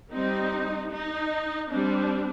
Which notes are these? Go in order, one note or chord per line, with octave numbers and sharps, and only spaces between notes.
G3 C4 D#4
D#4
G3 C4 D4